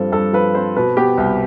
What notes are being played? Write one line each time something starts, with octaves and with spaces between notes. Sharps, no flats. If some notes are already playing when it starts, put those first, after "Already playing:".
Already playing: G2 F3 C4 A4
G2 A4
F3 B4
C4 C5
B2 B4
B3 G4
C2